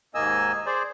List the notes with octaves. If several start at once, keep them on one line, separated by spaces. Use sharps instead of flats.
D#2 G#2 A#3 D#5 G#5 E6
G#4 C5 D5